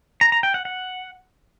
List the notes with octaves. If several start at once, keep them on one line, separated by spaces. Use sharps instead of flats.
A#5
A#5
G5
F#5
F#5